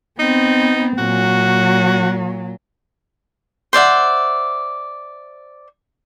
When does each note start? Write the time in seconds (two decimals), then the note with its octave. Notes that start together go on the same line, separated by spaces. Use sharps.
0.19 B3 C4 D#4
0.98 A#2 F#3 F#4
3.73 C5 D5 E5 F#5